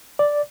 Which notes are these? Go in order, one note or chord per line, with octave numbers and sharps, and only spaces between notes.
D5